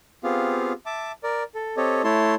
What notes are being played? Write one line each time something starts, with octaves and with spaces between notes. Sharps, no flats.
B3 C4 F4 G4 G#4 F5
E5 A5 D6
A#4 D5
A4
C4 G4 A4 C#5 D#5
A3 E4 C#5 A5 C6